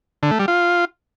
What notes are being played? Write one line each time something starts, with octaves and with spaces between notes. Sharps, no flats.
D3
A3
G3
F4